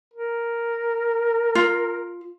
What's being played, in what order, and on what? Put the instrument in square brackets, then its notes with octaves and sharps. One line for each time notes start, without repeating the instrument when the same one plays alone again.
[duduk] A#4
[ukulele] F4